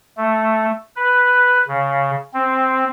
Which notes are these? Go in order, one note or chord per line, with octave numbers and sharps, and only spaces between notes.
A3
B4
C#3
C4